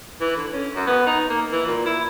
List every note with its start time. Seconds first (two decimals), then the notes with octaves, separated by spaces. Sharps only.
0.21 E3
0.36 D3
0.53 C#4
0.76 F#2
0.87 B3
1.07 D#4
1.29 A#3
1.52 E3
1.66 A#2
1.86 E4